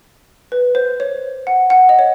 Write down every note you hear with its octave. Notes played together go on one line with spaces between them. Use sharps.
B4
C5
C#5
F#5
F#5
D#5
C#5